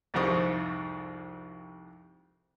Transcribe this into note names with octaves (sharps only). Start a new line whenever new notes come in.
C2 F2 G#2 C3 C#6 D#6